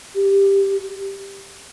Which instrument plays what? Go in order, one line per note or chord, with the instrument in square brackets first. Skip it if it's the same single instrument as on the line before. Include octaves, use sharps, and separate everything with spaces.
[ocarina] G4